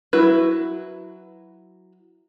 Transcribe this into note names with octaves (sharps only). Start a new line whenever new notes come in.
F#3 E4 F#4 B4